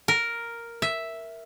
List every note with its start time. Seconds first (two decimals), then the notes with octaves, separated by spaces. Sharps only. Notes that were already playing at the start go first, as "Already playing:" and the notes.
0.08 A#4
0.82 E5